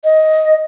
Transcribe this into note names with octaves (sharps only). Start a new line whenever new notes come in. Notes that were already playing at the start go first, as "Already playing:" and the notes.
D#5